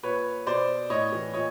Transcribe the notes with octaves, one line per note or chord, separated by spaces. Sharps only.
A#2 B4 C#5
B2 C5 D5
A2 C#5 D#5
E3
A#2 C#5 D#5